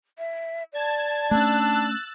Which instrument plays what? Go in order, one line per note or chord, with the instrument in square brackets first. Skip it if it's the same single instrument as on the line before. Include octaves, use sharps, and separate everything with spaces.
[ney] E5
[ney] D5 [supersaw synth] A5 G#6
[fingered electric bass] A3 C#4 [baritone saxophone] D4 [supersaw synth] E6 F#6 A6